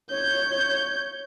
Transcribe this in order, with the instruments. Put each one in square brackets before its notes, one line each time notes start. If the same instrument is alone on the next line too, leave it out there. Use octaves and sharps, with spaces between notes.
[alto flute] C#5 [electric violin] G6